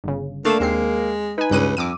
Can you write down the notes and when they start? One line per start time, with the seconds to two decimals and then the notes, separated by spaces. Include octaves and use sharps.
0.04 G1 C#3
0.45 A3 A#3 D4 C7 E7
0.60 D#2 G#3 C4 C7
1.38 D#4 B4 G#5
1.51 C#2 G2 F#6 D#7
1.77 F2 D6 E6 D#7